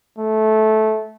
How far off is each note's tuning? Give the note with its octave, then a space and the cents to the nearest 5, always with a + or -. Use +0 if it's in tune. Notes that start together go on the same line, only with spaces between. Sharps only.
A3 -15